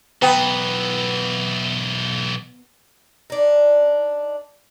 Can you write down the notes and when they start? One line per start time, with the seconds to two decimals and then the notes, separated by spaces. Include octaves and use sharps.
0.22 B1 E3 B3 G5 A#5
3.30 D4 D#4